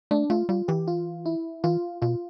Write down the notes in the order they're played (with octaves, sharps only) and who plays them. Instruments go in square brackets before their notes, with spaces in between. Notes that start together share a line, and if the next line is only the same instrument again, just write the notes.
[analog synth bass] A3 [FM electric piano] D4
[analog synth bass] A3 [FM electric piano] F4
[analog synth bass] G3 [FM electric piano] F4
[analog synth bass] E3 [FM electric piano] G4
[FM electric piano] F4
E4
[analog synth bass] E3 [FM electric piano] F4
[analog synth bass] B2 [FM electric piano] F4